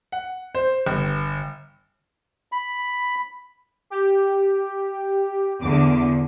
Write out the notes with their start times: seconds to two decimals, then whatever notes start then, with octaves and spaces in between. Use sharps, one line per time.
0.12 F#5
0.55 C5
0.86 G1
2.52 B5
3.90 G4
5.60 E2 D3 D6